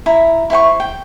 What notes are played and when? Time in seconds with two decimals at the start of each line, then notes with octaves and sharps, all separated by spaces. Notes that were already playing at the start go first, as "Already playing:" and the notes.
0.06 E4 A#5
0.50 E4 C5 G5 C#6
0.80 G5